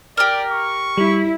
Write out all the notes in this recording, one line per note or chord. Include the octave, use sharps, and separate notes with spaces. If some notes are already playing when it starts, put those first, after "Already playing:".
G4 A#4 D5
C#6
G3 E4